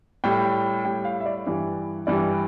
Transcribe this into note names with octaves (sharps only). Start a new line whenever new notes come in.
A2 G3 G5
A2 G3 G5
F5
E5
D5
G2 E3 G3
G2 E3 G3 D5